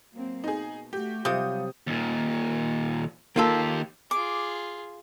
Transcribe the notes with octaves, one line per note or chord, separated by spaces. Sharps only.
F#3 A#3 C4
B2 D#4 G#4
A3 F#4 G4
C3 F#3 G3 F4 D#6 G6
D#2 A#2
D#2 A#3 F4 G4 A4
F4 G#4 D6